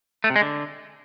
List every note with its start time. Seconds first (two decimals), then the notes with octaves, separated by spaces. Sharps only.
0.24 A3
0.30 C3
0.36 G#3
0.41 D3